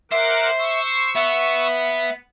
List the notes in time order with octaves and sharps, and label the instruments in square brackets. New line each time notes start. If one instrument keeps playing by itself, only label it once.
[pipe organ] A#4 F#5 D6 [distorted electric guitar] C5 [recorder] E5
[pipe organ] C#6 E6
[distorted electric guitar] B3 [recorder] E5